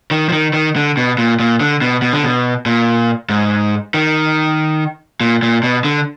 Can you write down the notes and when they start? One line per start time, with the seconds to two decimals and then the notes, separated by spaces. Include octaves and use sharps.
0.11 D#3
0.29 F3
0.33 D#3
0.54 D#3
0.76 D3
0.97 B2
1.18 A#2
1.40 A#2
1.61 D3
1.82 B2
2.02 B2
2.13 D3
2.23 B2
2.66 A#2
3.29 G#2
3.94 D#3
5.21 A#2
5.43 A#2
5.63 B2
5.85 D3